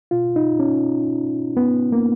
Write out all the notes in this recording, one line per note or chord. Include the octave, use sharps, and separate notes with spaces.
B2 F4
D#4
C#4
B3
A#3